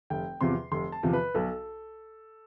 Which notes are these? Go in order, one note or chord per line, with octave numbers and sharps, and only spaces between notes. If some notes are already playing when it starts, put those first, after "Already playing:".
F1 G5
E2 C3 F3 C6
F1 C6
A5
E2 C3 F3
B4
B1 A4